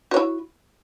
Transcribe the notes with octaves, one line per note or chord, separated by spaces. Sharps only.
E4 F#4 C#5